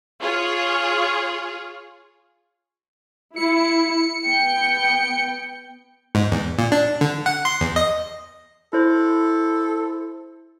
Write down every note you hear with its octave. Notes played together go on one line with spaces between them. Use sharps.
F4 G#4 C#5
E4 C#7
B3 G5
G#2
E2
A#2
D4
D3
F#5
C6
E2
D#5
E4 A4 C5